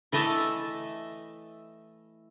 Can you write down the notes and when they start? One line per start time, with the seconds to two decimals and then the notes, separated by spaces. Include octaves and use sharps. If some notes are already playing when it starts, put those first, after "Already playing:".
0.12 E3 A3 D#5 E5 A5